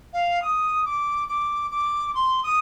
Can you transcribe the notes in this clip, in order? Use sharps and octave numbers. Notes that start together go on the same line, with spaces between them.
F5
D#6
D6
D6
D6
C6
D#6